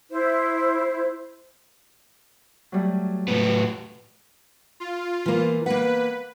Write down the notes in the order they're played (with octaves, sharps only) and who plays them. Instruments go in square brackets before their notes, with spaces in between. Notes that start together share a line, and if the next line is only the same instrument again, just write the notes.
[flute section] E4 C5
[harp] F#3 G3 A3
[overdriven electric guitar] A2 B3
[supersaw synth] F4
[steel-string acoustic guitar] E3 A#3
[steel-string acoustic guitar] A#3 F#5 [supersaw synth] B4